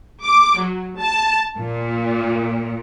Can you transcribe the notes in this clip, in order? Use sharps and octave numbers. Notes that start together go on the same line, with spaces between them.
D6
F#3
A5
A#2